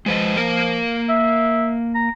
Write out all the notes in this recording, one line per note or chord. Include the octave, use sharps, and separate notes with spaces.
F3 G#3 B4 D#5
A#3 A#4
E5
A#5